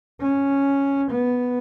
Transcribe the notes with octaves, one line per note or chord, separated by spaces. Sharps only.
C#4
B3